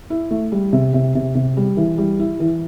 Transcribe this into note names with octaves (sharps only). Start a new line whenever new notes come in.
E4
A3
G3
C3
C3
C3
C3
G3
E3
G3
E4
E3